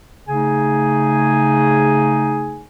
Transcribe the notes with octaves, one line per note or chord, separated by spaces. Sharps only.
C#3 A3 D#4 G#4 G#5